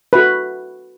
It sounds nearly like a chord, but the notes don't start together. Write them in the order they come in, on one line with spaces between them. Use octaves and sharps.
B4 F#4 A4